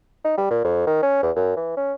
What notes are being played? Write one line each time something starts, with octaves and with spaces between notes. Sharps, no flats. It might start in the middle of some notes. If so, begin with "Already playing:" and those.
D#4
G3
A#2
F2
D#3
C#4
E2
F#2
E3
C#4